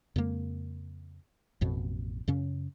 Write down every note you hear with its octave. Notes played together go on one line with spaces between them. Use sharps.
F2 C#3 G#3 A#3
A1 F2 B2
F#2 C#3 C#4